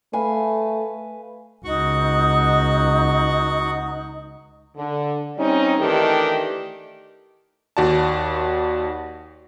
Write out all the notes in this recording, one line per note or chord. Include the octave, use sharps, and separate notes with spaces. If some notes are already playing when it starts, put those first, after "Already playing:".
A3 B4 F5 G#5
C#2 D#4 F#4 F#5 C#6
D3
G3 C4 C#4 D#4
D#3 E3 A3 D4 G4 D#5
D#2 F#4 D5 A5